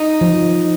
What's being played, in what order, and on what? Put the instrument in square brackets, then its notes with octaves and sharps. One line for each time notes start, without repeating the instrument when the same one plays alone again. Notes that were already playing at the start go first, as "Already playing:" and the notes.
Already playing: [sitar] D#4
[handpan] F3